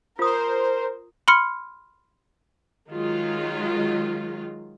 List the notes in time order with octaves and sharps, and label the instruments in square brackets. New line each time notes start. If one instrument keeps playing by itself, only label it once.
[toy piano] F4 D#6 [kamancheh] A#4 [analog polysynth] C5
[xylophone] B5 C6 F6 C#7
[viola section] D#3 F#3 G#3 F4